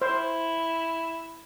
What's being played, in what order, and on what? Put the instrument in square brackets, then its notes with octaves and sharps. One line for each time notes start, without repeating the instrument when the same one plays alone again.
[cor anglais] E4 [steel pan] C5